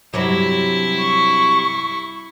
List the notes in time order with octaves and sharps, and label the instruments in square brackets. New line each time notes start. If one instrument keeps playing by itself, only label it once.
[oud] G2 C3 F#3 [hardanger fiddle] E4
[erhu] C#6